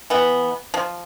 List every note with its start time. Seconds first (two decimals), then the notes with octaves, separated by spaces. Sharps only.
0.10 E3 B3
0.74 F3